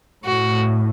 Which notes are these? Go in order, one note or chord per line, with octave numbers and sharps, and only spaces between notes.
A2 F#4